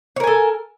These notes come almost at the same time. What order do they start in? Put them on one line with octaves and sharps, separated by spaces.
C#5 A#4 G#5 A4